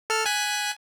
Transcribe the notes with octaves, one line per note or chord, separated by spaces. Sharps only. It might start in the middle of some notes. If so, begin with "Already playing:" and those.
A4 F6
G#5 F#6 B6